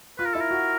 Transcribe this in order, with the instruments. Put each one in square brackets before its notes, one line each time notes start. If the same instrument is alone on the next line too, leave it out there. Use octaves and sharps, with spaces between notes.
[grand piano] F4 [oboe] B4
[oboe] A#4
[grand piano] E4 [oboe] A4
[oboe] A#4
[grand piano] F#4